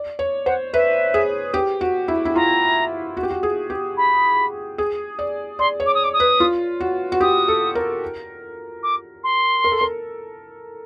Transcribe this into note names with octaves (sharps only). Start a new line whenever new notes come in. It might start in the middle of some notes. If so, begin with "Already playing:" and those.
Already playing: D5
C#5
C5 F#5
B4 E5
G#4
G4
F#4
E4
E4
F4 A#5
F#4
G4
F#4
G#4
G4
B5
G#4
D5
D5 C6
C#5
D6
D#6
D6
D#6
B4
F4
F#4
F#4
G4 D#6
A4
A#4
D6
C6
A#4
A4
A#4